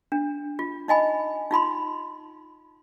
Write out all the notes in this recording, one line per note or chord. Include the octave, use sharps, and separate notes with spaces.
D4
F4
D#4 D#5 G#5 B5
D#4 F4 B5 C6